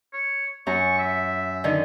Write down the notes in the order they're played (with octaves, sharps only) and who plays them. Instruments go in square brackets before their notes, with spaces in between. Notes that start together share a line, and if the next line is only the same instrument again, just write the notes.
[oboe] C#5
[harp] F#2 A#5 [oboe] C#6
[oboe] E5
[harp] D3 D#3